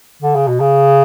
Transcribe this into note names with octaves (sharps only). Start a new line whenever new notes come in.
D3
C#3
B2
C#3